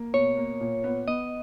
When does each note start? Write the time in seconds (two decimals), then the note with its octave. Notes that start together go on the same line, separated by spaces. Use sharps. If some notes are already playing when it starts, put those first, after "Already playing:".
Already playing: A#3
0.14 B2 C#5
0.37 A#3
0.61 A#2
0.84 B3
1.08 B3 D#5